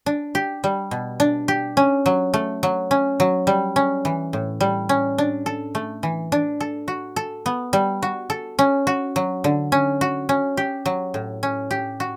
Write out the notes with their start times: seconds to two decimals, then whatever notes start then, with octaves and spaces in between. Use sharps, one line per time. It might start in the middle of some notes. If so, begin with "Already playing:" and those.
0.06 D4
0.35 G4
0.64 G3
0.91 B2
1.20 D4
1.48 G4
1.77 C#4
2.06 F#3
2.34 A3
2.63 F#3
2.91 C#4
3.20 F#3
3.47 G3
3.76 C#4
4.05 E3
4.33 A2
4.61 G3
4.89 C#4
5.18 D4
5.46 A4
5.75 A3
6.03 E3
6.32 D4
6.60 A4
6.88 F#4
7.16 A4
7.46 B3
7.73 G3
8.02 F#4
8.30 A4
8.59 C#4
8.87 F#4
9.16 F#3
9.44 D3
9.72 C#4
10.01 F#4
10.29 C#4
10.57 G4
10.86 F#3
11.14 A2
11.43 C#4
11.71 G4
12.00 F#4